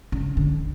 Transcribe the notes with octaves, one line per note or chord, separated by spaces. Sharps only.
C#3
D3